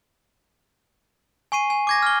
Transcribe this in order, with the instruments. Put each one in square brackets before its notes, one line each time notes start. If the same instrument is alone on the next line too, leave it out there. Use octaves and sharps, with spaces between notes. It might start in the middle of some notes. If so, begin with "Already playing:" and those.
[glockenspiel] G#5 C#6 C7 D#7
G#5
D6 G#6 A#6
F6 G7